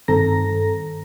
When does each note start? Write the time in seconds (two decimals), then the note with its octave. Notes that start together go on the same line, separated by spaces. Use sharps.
0.08 G2 D#3 C4 A4 A#5 A#6